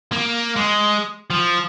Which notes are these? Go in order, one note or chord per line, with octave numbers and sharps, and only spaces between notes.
A#3
G#3
F3